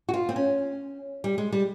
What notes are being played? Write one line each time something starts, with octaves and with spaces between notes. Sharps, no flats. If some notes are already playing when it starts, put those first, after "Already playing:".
F#4
F4
C4
C#4
G3
G#3
G3